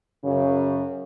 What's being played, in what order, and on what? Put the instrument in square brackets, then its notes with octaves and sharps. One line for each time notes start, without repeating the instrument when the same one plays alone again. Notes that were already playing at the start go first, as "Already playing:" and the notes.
[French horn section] F#2 C#3